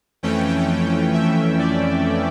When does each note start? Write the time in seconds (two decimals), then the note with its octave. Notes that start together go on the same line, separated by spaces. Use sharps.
0.23 F2 E3 A3 C#4 G5
1.13 E5
1.59 D5